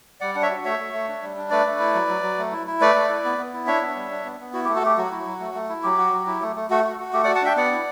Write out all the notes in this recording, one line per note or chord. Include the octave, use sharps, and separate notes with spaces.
G3 D5 F#5
D4 F#5
C#5 E5
F#4
A3 C#5 E5
A3
A3
D4
G3
D4
A3 B4 D5
A3
E4
F#3
F#3
F#3
A3
E4
E4
A3 B4 D5
A3
E4
B3
B3
E4
D4 C#5 E5
B3
G3
D4
B3
B3
E4 F#4
G4
A3
F#4 A4
A3 G4
F#3 F#4
E4
F#3
A3
A3
E4
F#3 G4
F#4
F#3
E4
A3
A3
A3 F#4
F#4
F#4
A3 G4
D5 F#5
F#4
F#5 A5
D4 E5 G5
B3 D5 F#5
E4